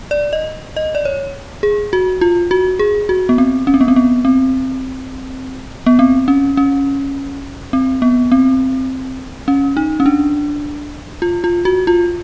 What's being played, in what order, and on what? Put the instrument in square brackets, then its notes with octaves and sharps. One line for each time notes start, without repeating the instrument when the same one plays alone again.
[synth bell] D5
D#5
D#5
D5
C#5
G#4
F#4
F4
F#4
G#4
F#4
B3
C4
C#4
C4
B3
C4
B3
C4
B3
C4
C#4
C#4
C4
B3
C4
C#4
D#4
C#4
D4
F4
F4
F#4
F4